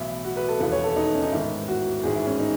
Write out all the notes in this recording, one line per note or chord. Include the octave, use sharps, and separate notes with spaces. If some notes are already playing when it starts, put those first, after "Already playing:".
Already playing: B1 A2 E3 E4
F#4
B4
A4
E1 D#2 C#3 E3 B4
C#5
A4
D#4
C#4
D#4
A1 G#2 D#3 E4
F#4
A1 G#2 D#3 G#4
E4
C#4
D#4